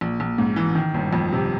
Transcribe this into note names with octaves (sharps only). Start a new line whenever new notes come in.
A#1
A#1
G#2
E3
D#3
G1
F2
C3